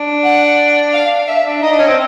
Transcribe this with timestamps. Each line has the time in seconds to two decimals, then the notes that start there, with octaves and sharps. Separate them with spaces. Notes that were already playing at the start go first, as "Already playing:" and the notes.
Already playing: D4
0.24 F#5
0.93 F5
1.28 E5
1.44 D4
1.62 D#4 D#5
1.71 D4
1.79 C#4
1.88 C4